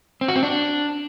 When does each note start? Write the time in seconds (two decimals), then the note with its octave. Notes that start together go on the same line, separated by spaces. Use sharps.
0.21 C4
0.28 F#4
0.36 C4
0.43 D4